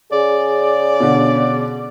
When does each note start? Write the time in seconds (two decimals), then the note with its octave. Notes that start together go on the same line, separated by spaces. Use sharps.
0.12 C#3 G#4 D5
1.00 B2 D3